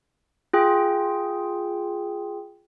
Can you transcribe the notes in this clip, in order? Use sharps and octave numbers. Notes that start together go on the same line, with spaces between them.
F4 G#4 G5